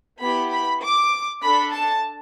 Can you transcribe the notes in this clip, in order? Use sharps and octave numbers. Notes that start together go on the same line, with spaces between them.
B3 E4 G4 B5
B5
D6
D4 A4 B5
A5